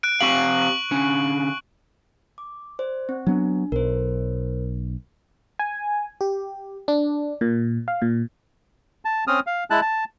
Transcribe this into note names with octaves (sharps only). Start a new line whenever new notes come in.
F#6 D7
C4 G4 F5 C#6 F#7
C#6
D3 C#4
D6
C5 D5
C4
F#3 B3 D4
B1 A#4 C5
G#5
G4
D4
A#2
F5
A#2
A5
C4 C#4 D#6 F6
F5
G#3 E4 A5 F#6
A5